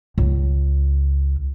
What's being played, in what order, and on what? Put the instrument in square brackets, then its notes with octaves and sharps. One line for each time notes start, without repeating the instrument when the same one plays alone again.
[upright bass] C#2